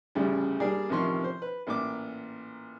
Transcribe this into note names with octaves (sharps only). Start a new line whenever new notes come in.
A1 D2 C#3 G3
G3 A#3 D4 G#4 A#4 D5
A1 C3 D#3 F3 C6 C#6
C5
B4
A1 A#2 D6